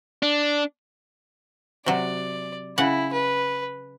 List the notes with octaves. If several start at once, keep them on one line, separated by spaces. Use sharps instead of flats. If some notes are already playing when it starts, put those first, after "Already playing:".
D4
C3 F#3 D5
C#3 E4 F#5
B4